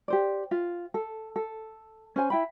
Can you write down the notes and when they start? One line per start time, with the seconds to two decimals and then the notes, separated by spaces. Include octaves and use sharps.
0.08 G4 C5 D5
0.51 F4
0.94 A4
1.36 A4
2.16 C#4 C5 G#5
2.30 E4 G5 B5